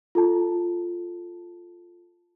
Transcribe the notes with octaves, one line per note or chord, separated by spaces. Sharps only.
F4 A4 A5